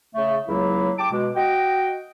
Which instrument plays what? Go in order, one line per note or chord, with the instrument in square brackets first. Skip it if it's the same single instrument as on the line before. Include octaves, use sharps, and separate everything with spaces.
[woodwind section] C#3 A3
C#2 F#3 A#3 E4
G5 A5 D6
B2 G#3
F#4 D#5 G5